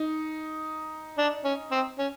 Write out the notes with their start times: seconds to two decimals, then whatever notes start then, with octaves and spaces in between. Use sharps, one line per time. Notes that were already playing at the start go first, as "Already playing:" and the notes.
Already playing: D#4
1.18 D4
1.45 C#4
1.71 C4
1.99 C#4